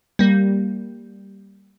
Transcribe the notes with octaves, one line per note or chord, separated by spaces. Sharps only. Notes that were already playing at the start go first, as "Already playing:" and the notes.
G3 A#3